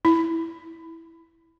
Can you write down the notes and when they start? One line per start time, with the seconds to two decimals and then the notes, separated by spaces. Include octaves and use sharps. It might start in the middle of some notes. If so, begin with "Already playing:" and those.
0.05 E4